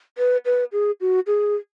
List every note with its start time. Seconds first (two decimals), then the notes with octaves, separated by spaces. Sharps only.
0.18 B4
0.45 B4
0.72 G#4
1.01 F#4
1.27 G#4